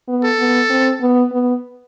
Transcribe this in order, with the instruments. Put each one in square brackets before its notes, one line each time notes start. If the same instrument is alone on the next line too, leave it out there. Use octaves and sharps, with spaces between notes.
[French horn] B3
[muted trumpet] A4
[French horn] B3
C4
B3
B3